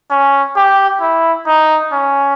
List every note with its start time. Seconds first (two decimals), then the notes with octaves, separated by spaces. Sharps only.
0.10 C#4
0.56 G4
1.01 E4
1.46 D#4
1.92 C#4